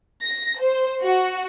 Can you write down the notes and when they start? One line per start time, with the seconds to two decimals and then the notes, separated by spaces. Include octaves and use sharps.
0.23 A#6
0.61 C5
1.02 F#4